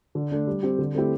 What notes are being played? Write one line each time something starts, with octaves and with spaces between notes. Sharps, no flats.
D3
A3 D4
G3
C4 G4
D3
A3 C4 E4 G4